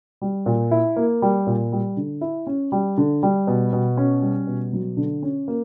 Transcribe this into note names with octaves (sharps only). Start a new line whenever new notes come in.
G3
A#2
E4
A#3
G3
A#2
G3
D3
E4
C#4
G3
D3
G3
B2
B2
C#4
G3
B2
F#3
D3
C#4
A#3